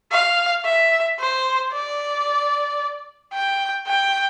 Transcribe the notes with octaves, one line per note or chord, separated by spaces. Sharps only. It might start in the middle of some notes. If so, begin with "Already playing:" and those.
F5
E5
C5
D5
G5
G5